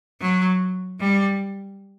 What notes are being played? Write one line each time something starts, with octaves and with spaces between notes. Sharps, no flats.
F#3
G3